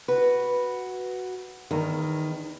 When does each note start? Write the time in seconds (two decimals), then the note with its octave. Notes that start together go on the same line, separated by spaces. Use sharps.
0.08 F#4 B4
1.71 E2 D#3